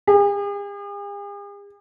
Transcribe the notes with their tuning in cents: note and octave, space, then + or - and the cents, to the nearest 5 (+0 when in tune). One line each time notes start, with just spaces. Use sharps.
G#4 -45